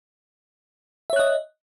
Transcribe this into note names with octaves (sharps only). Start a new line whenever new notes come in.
C#5 D#5 E5 F#6